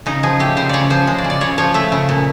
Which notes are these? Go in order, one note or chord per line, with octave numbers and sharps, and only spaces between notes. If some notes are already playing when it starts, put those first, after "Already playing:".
C#3 D#4
F3 G#4
A3 G4
C#3 C5
C#3 C#5 D5
F3 C5
G#3
D5
C#3
D5
C#3 C#5
F3 C#5
A3 E5
C#3
A#2